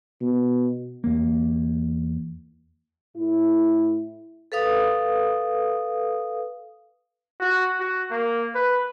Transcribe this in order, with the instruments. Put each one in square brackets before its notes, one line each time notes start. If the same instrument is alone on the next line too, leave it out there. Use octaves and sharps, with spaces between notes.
[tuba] B2
[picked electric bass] E2 A#3
[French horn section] A2 E4
[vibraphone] A4 B4 F5 D#6
[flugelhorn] F#4
F#4
A#3
B4